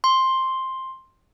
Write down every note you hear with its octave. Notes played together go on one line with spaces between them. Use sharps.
C6